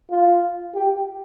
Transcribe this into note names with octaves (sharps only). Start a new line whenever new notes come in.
F4
G4